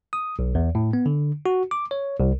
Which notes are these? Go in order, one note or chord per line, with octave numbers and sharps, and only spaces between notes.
D#6
B1
E2
A2
B3
D3
F#4
D6
C#5
C2